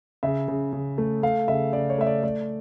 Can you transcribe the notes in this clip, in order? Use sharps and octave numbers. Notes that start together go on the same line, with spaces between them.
C#3 E5
C#3
C#3
A3
A3 F5
C#3 E5
C#3 D5
C#5
A3 E5
D5
A3 D5